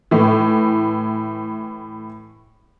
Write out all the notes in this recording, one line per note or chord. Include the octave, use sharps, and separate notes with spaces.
A2 E3